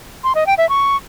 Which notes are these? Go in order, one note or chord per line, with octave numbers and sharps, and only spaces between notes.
C6
D#5
G5
E5
C#6